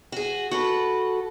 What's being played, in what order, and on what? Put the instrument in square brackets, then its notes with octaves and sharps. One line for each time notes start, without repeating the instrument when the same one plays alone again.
[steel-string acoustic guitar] F#4 G#4
F#4 A4 B4